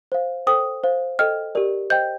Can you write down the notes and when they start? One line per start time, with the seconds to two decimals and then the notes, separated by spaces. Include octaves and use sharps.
0.12 C5 F5
0.47 A4 C5 G5 D#6
0.84 C5 F5
1.19 A4 D#5 G5 F6
1.55 G4 A#4 D5
1.90 C5 D#5 G5 G6